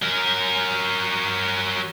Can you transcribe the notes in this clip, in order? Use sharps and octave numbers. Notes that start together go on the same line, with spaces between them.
F#3 A#4